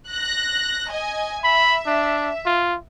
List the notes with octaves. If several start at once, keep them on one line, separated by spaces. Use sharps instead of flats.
F#6 A#6
D#5 G#5
E5 B5
D4
F4